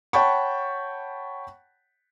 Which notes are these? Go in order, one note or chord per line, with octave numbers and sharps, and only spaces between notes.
C#5 F#5 G5 A5 B5 C#6